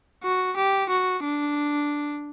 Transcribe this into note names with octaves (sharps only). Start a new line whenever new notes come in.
F#4
G4
F#4
D4